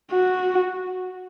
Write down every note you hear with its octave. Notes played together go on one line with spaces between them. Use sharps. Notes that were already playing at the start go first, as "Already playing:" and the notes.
F#4